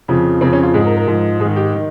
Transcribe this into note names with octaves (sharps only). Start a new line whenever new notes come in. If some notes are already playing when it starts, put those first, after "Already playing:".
F2 C#3 F3
F2 C#3 F3 C4
C#4
F4
G#2 F3 G#4
A#4
A#4
G#2 F3
G#2 G#4
D#3
G4
D#3